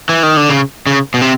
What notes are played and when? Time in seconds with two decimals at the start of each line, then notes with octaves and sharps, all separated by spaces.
0.09 E3
0.23 D#3
0.37 D3
0.49 C#3
0.87 C#3
1.14 B2
1.21 C3